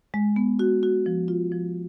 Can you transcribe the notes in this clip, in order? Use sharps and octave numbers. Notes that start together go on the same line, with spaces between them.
G#3
B3
F#4
F#4
F3
F4
F3